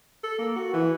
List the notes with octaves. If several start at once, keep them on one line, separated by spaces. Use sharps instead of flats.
A4
A#3
F#4
E3